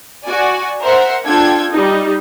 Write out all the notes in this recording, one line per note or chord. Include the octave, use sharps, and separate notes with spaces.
F#4 D5 G#5
A#4 C5 E5 F#5
D4 F4 A4 G5 G#6
G3 D#4